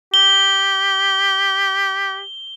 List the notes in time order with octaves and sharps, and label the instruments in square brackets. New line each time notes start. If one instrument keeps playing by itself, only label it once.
[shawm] G4 [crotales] G7